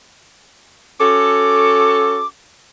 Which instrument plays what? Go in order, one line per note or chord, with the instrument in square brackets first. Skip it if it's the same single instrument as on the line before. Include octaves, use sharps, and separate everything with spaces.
[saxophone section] C#4 F#4 A4 [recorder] D6